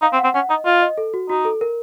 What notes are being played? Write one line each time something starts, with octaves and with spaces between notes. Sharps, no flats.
D#4 F5
C4
F#5
C4
C#4 F#5
D#4 D#5
F4 D#5
D#5
A4
F#4
D#4 F#4
A4
A#4